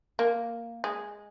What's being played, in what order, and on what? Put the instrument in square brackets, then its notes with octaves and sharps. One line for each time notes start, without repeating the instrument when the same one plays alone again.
[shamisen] A#3
G#3